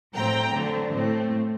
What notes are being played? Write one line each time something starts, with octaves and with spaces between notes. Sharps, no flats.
A2 F#3 C4 G5 A#5
D3 F#3 A3 C4
A2 A3 C4